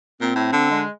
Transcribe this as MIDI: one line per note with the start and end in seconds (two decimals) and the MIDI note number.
0.21 0.33 46
0.21 0.71 60
0.36 0.50 45
0.52 0.83 50
0.71 0.89 56